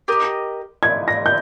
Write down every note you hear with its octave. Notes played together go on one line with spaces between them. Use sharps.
G4 A#4 D#5
G#6
A#6
G6